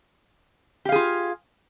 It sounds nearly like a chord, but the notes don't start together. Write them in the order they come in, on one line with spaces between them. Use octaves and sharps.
G4 F5 G#4 F4